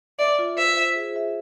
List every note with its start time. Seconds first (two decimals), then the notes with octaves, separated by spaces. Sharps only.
0.19 D5 E5
0.39 F4
0.58 C5 E5
0.77 F4
0.96 G#4
1.16 E5